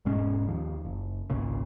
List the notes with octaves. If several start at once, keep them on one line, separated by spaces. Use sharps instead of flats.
E1 G#2 G#3 C#4
D#2 F3
F#1
G#1 C#2 A#2 C#3